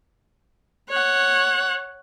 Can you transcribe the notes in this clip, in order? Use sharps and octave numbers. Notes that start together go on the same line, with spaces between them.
C#5 F#5